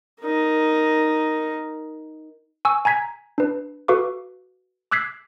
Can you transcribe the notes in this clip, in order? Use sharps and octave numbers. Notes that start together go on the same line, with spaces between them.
D#4 A#4
G#5 C#6 E6
G#5 A#5 G#6 B6
D4 B4
F#4 A4 B4 F5 C#6 D6
D6 E6 F#6 G#6 B6 C7